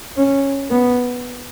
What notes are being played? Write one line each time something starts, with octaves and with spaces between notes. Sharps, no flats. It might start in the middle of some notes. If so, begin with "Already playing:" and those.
C#4
B3